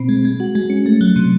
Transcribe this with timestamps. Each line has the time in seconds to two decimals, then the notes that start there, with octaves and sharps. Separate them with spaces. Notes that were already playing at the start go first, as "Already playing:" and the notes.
Already playing: B2 C4
0.09 G#3
0.25 G#3
0.40 F#4
0.55 G#3
0.70 C#4
0.86 A3
1.01 F#3
1.16 C3